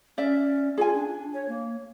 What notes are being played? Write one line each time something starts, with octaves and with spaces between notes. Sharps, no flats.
C#4 D5 E5
F4 G#4 G#5
D4
C#5
A#3